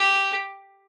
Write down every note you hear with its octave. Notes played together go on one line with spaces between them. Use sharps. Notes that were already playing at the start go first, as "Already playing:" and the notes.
Already playing: G4